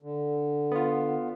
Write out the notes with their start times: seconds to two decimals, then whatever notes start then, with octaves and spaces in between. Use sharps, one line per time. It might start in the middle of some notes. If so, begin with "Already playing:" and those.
0.02 D3
0.72 B3 F4